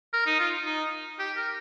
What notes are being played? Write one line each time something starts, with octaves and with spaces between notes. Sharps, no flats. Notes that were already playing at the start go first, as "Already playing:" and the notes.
A#4
D#4
F4
D#4
G4
A#4